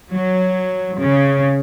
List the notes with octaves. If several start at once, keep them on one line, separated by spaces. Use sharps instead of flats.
F#3
C#3